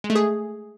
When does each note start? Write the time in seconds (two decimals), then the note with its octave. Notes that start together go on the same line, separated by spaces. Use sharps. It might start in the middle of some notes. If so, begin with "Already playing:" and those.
0.04 G#3
0.10 A3
0.15 G#4